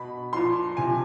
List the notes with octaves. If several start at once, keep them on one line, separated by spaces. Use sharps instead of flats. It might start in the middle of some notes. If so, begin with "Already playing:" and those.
Already playing: B2 B5
A#2 F3 C6
C3 F3 G#5